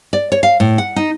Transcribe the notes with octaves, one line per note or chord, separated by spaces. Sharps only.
D5
C#5
F5
A2
F#5
D#4